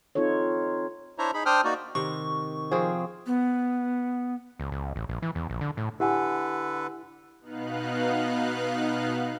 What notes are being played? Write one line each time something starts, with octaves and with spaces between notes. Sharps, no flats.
C4 D#4 F4 A4 C#5
D4 E4 C5 C#5 E5 A#5
D#4 G#4 B5
D4 C5 G5 D#6 F6
A#3 D#4 F#4 D5
C3 D#3 C#6
F3 C4 G#4
B3
C#2
C#2
A1
A#1
E3
E2
A#1
D3
A2
D3 E4 G4 A4 B4 F#5 G#5
B2 B3 D#4 F5 F#6